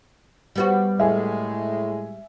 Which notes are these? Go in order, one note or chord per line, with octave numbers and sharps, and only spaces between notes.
G3 B3 F#4
A2 G#3 E5 G#5